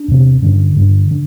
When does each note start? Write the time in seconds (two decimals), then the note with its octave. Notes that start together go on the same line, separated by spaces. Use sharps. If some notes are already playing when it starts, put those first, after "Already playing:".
Already playing: D4
0.08 E2 C3
0.42 G2 D3 C#4
0.76 G2 D3
1.11 D3